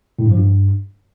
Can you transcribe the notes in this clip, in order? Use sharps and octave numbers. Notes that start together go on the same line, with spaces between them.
A2
G2
F3
G2